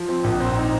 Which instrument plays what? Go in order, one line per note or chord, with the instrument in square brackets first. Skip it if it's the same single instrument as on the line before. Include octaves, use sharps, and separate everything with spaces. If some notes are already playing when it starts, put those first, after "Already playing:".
Already playing: [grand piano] F3
C4
A#1
C4
D#4